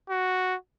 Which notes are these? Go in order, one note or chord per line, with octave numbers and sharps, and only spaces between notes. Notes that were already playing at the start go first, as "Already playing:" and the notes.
F#4